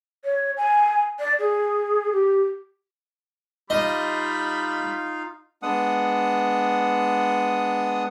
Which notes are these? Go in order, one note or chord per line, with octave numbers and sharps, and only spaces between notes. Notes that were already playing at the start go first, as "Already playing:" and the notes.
C#5
G#5
D5
G#4
G4
G3 D#4 F4 D#5 F5 B5
G#3 B3 D4 F#5 D#6